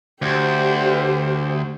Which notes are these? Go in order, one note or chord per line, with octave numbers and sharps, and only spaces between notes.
D2 G4 C5